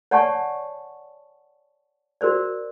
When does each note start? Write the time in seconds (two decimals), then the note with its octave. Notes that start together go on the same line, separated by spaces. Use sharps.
0.11 C#5 D5 F#5 G#5 A5 C#6
2.21 F#4 A#4 C5 D5